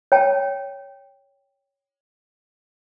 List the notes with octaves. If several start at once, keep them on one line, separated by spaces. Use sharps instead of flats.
C#5 G5 A5